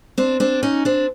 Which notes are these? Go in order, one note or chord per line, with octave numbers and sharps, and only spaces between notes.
C4 D4
C4 D4
C#4 D#4
C4 D4